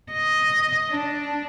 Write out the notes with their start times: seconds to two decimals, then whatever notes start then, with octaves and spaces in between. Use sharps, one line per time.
0.12 D#5
0.91 D4